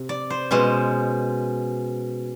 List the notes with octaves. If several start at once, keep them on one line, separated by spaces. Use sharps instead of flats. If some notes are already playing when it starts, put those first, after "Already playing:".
Already playing: C3
D5
C5
B2 G#3 C#4 C5